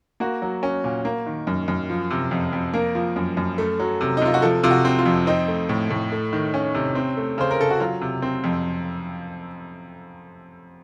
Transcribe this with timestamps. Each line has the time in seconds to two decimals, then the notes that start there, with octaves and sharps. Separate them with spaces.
0.20 A#3 F#4
0.42 F#3
0.63 C#4
0.84 A#2
1.05 A#3
1.26 D#3
1.47 F#2
1.68 F#2
1.90 F3
2.10 C3
2.31 F2
2.53 F2
2.74 A#3 A#4
2.95 F3
3.16 F#2
3.37 F#2
3.58 A3
3.79 F#3
4.01 C3
4.17 D#4
4.21 C3 F4
4.34 F#4
4.42 F3 A4
4.63 C3 F4
4.71 F#4
4.85 C4
4.99 F4
5.06 F2
5.27 C4 D#4
5.48 A3
5.69 A2
5.90 A2
6.12 A3
6.33 D#3
6.54 C#4
6.74 C3
6.95 C4
7.17 A3
7.38 C#3 C5
7.51 A#4
7.60 C#3 A4
7.70 F#4
7.80 F#3 F4
8.01 C3
8.22 C4
8.44 F2